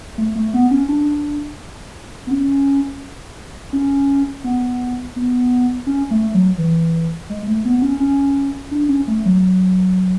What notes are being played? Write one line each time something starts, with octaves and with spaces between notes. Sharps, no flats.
A3
A3
B3
C#4
D4
B3
C#4
C#4
B3
B3
C#4
A3
F#3
E3
G#3
A3
B3
B3
C#4
C#4
D4
C#4
A3
F#3